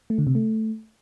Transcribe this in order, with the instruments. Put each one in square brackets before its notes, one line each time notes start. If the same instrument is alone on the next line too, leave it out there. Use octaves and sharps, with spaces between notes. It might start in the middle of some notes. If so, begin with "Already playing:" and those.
[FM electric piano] A3
D3
C3
A3